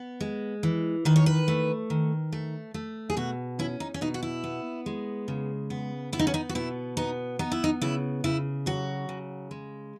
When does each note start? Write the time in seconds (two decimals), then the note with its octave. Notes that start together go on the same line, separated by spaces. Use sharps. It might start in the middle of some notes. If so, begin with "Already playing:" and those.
Already playing: B3
0.20 G#3
0.63 E3
1.05 D#3 B4
1.16 C#5
1.26 B4
1.48 A3
1.90 D#3
2.32 A3
2.74 A3
3.10 G#4
3.17 B2 F#4
3.59 C#4 E4
3.80 D#4
3.94 C#4
4.01 B2 D#4
4.14 F#4
4.23 E4
4.44 B3
4.86 G#3
5.28 C#3
5.70 B3
6.12 B3 E4
6.19 D#4
6.27 C#4
6.34 D#4
6.49 F#4
6.55 B2 E4
6.97 B3 D#4
7.39 B3 D#4
7.52 E4
7.64 D#4
7.81 C#3 E4
8.24 C#3 E4
8.66 F#3 F#4
9.09 C#3
9.51 G#3